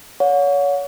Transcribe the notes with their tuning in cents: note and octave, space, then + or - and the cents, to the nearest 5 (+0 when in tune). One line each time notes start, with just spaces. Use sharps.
C#5 +30 F#5 -40